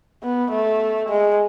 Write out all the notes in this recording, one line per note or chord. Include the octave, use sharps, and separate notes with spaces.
B3
A3
G#3